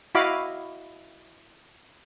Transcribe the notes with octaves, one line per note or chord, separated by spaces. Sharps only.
E4 F#4 D#5 F5 B5 D6